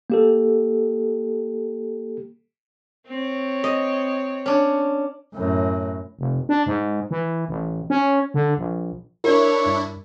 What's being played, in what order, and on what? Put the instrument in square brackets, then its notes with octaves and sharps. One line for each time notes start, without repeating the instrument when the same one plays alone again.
[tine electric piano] A#3 G4 A4
[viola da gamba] C4 C#5
[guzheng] D#5
C#4 D4
[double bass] F#2 A2
[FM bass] F1
D4
G#2
E3
A1
C#4
D3
A#1
[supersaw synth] D4 E4 [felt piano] A#4 [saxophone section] C#5
[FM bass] G2